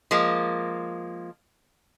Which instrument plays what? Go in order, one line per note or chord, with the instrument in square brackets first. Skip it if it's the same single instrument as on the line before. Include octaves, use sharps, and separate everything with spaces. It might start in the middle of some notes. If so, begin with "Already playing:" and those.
[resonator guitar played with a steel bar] F3 G#3 A#3